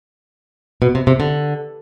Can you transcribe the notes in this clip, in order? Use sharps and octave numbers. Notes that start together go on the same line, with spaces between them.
B2
C3
C3
D3